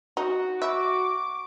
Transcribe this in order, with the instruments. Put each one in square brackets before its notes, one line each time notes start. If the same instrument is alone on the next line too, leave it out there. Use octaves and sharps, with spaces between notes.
[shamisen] D#4 [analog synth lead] F#4
[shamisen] E5 [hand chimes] B5 C#6 [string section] D6